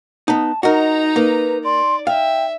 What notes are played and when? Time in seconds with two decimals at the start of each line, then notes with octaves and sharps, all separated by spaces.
0.28 B3 D#4 A5
0.63 D#4 F#4 A#4 D#5 A#5
1.16 A#3 B4
1.65 D5 C6
2.07 E5 F5 G5